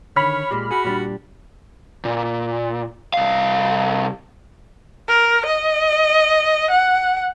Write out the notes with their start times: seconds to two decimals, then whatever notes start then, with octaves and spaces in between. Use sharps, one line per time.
0.16 D3 D#3 C#5 B5 F6
0.51 A#2 G#3 G4
0.71 F#4 G#4
0.85 A#2 G3 D4
2.05 A#2
3.14 C2 F5
5.08 A#4
5.45 D#5
6.70 F#5